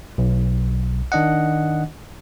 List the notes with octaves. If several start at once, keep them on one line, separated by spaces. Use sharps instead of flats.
B1
D#3 D4 D#5 F#5